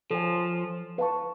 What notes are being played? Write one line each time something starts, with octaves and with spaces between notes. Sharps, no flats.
F3 A4 C#5 G#5
B4 F5 A5 C#6